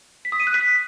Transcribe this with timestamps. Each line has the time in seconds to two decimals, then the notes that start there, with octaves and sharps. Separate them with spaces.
0.25 B6
0.32 D#6
0.40 D#7
0.47 F#6
0.54 B6